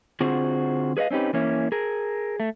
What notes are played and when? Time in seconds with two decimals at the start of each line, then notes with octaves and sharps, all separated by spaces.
0.21 D3 C4 F4 F#4 G#4 C5
0.97 G#4 B4 C#5 D#5 F5
1.11 C4 C#4 D#4 G4 B4
1.33 E3 A#3 C#4 E4
1.72 G#4 A#4
2.40 A3